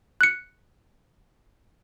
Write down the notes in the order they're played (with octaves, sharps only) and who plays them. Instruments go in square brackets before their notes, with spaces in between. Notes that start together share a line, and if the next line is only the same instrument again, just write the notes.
[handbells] F#6 C#7